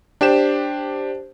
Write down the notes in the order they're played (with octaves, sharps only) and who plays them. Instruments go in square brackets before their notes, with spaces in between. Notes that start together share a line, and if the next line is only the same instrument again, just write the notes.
[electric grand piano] D4 G4 C5 E7